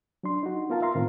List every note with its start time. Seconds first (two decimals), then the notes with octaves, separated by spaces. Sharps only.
0.23 F#3 D4 C6
0.43 D#4 F#4
0.70 B3 F4 A#4 F5 A5
0.82 E5 F5 A#5 C6
0.95 A2 D#3 C4 F4 A#4